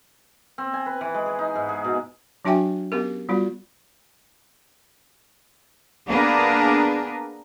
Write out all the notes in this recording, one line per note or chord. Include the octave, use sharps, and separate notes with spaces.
C4
G#5
B4
E3
G#3
G#4
D#4
G#2
G#4
B2
F#3 D4 F#4 E5 G5 G#5
B3 C#4 G4 A#4
G3 B3 F4 F#4
A#3 B3 D4 G#4 A#4 B4